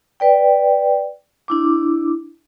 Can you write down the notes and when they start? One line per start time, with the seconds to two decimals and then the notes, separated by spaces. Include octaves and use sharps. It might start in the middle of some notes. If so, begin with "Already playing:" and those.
0.20 B4 D5 G5
1.48 D4 E4 D6